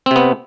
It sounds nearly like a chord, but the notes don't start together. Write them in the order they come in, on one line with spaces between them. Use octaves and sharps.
C4 C3 B3